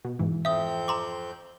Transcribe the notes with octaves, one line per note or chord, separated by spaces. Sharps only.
B2
G#2 E3
F2 C4 E5 D#6 G6
A#5 C6 D6